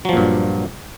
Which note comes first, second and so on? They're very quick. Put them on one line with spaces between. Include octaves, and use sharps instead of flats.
F#3 F3 A#2 G2